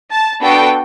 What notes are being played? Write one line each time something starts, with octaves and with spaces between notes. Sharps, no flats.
A5
B3 D4 F#4 A4 G5